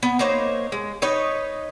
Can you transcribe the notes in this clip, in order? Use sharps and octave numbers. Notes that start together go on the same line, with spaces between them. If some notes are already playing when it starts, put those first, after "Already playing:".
B3
A#3 D#4 C5 C#5
G#3
D#4 B4 C#5 D#5